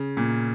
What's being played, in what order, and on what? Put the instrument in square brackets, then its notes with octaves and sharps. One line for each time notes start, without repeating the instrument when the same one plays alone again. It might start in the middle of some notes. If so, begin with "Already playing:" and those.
Already playing: [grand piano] C#3
A#2